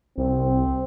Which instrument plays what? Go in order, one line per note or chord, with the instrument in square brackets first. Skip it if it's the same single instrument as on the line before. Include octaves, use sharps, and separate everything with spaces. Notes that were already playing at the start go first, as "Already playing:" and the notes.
[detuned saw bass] C2 [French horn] C4